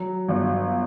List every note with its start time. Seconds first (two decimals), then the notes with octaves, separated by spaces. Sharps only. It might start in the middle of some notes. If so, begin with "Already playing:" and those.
Already playing: F#3
0.28 G1